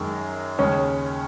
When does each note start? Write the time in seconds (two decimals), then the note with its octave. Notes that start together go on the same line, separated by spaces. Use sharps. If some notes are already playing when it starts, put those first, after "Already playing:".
Already playing: F#2 D#3 G#3
0.58 D#2 C#3 G#3 C#4